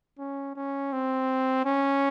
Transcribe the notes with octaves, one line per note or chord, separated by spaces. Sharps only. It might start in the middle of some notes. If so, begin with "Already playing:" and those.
C#4
C#4
C4
C#4